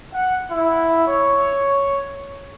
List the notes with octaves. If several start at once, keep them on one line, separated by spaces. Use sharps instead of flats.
F#5
E4
C#5